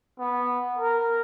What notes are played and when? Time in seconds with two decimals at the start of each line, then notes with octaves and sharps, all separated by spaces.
0.19 B3
0.78 A#4